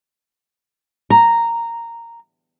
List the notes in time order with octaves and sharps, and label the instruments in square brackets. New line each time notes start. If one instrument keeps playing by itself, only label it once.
[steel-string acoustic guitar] A#5